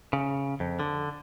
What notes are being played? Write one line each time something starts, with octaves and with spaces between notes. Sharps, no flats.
C#3
F2
D3